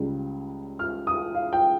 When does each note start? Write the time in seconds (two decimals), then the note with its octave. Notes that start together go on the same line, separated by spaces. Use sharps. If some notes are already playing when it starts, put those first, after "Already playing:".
Already playing: C#2 C#3 G3
0.79 F6
1.07 D#6
1.35 F5
1.53 G5